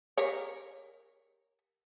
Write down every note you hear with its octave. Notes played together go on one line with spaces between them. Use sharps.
G4 A#4 C#5